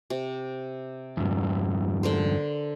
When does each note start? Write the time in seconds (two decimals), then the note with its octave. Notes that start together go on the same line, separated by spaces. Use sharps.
0.10 C3
1.17 E2 G2
2.03 D3 A#4 C5